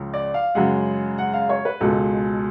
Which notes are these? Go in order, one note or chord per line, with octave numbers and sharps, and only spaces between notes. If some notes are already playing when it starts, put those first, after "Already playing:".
Already playing: C#2 C#3 F3
D5
F5
F#2 C#3 G#3 F#5
F#5
F5
C#5
B4
C#2 B2 G#3 A4